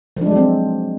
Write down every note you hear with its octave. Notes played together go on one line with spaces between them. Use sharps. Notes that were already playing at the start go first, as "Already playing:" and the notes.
F3 F#3 G#3 C4 D4